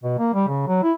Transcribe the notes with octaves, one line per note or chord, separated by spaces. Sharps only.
B2
A#3
G3
C#3
F#3
E4